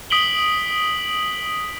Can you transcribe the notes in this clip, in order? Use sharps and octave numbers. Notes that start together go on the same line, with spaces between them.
D#6 B6 D7 F#7 G7